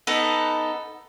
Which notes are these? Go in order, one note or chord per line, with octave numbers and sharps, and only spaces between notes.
B3 D#4 A4